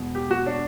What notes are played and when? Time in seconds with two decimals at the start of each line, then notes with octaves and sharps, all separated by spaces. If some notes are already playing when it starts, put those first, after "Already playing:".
Already playing: E1 E2 B2
0.15 G4
0.31 F#4
0.46 D4